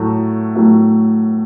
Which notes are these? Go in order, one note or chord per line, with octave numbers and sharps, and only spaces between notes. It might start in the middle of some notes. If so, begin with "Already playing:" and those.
Already playing: A2 F#3 A3
A2 F#3 A3